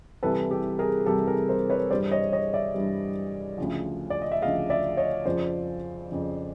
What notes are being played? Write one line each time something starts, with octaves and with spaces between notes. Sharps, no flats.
C2 C3 E3 G3 A4 B4
G4 A4
G#4 A#4
C2 C3 E3 G3 G4 A4
G#4 A#4
A#4 C5
B4 C#5
G2 E3 G3 C5 D5
C#5 D#5
C#5 D#5
D5 E5
G2 E3 G3
D2 C#3 F3
D5
D#5
E5
D2 C#3 F3 D#5 F5
D5 E5
C#5 D#5
F2 C#3 F3 C5 D5
F2 C#3 F3